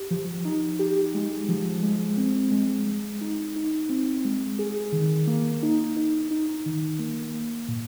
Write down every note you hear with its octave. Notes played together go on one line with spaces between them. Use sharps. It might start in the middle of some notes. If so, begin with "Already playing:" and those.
Already playing: G4
F3
D#4
G4
G#3
F3
G#3
C4
G#3
G#3
D#4
D#4
C4
G#3
G#4
D#3
A#3
D#4
D#4
D#4
D#3
A#3
A#3
A#2